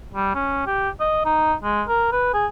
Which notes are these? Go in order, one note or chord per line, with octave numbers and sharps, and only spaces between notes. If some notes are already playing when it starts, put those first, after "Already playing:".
G3
C#4
G4
D#5
D#4
G#3
A#4
B4
G#4